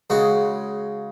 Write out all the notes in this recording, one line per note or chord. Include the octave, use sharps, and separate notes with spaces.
C#3 G#3 F#4